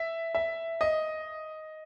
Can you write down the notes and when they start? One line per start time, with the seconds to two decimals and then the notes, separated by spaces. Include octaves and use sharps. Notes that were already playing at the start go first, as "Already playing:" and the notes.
Already playing: E5
0.35 E5
0.81 D#5